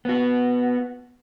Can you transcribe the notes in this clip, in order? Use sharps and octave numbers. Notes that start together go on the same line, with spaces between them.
B3 F#4